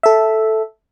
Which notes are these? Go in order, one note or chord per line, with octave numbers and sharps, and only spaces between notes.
A4 E5